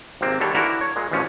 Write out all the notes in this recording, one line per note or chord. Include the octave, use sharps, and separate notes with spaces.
G#1 C3 A#3 C4
D#2 D3 G3 A4 C#5
D3 E3 A#3 E4 F#4 A#4
C#5
A#2 G#3
A1 D2 D3 F3 C#4